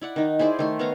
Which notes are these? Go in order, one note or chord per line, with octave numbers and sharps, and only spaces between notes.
E4 D5 F#5
D#3 D#4
E4 G#4 C5 D5
D#3 A3 C6
B3 C#5 F5 A#5